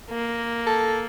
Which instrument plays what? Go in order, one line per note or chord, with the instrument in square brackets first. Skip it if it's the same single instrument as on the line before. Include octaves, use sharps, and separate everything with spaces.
[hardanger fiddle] A#3
[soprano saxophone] A4